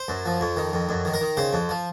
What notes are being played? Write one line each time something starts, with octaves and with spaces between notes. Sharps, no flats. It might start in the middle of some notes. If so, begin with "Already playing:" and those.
Already playing: C5
F#2
F3
F2
D#3
F2
F#2
D#3
A#4
D#3
C#3 C5
F2
F3